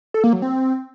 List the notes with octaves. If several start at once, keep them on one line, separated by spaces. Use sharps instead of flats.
A4
A#3
F#3
C4